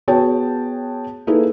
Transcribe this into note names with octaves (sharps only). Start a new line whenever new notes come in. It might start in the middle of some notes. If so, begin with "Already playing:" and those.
B3 F#4 G#4 C#5 G5 A5
A#3 D#4 E4 G#4 A4 B4